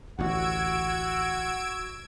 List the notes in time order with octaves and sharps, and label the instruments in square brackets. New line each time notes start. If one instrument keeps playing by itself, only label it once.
[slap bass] A1 D2 [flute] F#4 [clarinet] F#5 [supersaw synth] E6 G#6 D7